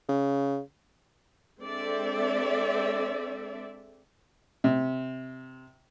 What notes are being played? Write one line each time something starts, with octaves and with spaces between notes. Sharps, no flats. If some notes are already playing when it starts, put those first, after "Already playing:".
C#3
G#3 C4 D4 A4 D5 E5
C3